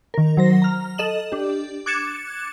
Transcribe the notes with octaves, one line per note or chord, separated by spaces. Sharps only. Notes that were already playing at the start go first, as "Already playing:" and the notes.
D#3 A#4
F#3 C5 A#6
A#5 F6
A4 D#5 E7 F#7
D4 G4
D6 F#6 G#6 A6 C#7 E7